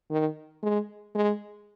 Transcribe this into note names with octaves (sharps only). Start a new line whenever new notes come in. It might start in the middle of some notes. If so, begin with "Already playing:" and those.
D#3
G#3
G#3